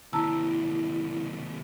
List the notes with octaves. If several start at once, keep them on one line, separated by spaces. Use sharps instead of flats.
D#2 C3 E4 A5 A#5 E6